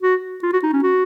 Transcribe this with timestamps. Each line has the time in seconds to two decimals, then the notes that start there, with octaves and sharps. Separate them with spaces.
0.03 F#4
0.43 F4
0.53 F#4
0.63 D#4
0.73 C#4
0.83 F#4